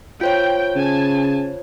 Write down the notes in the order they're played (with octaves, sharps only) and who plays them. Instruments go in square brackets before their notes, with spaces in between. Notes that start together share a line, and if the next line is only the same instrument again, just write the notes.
[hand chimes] F4 C5 C#5 [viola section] G5
[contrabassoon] C#3 [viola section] G#5 A5